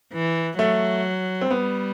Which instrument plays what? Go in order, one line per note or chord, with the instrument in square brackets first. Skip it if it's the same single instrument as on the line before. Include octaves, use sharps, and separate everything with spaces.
[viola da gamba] E3
[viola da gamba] F#3 [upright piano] A3
[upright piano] C4
[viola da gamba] G3 [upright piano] B3